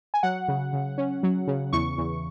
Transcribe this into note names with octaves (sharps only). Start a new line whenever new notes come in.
G#5
F#3 F#5
C#3
C#3
C#4
F#3
C#3
E2 C#6
E2